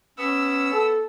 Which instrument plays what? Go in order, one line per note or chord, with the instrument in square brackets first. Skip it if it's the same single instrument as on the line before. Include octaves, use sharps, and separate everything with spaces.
[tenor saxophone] B3 [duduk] C#4 [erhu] E6
[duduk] A4